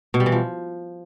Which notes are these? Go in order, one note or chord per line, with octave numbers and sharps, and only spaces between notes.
B2
G3
E3
F3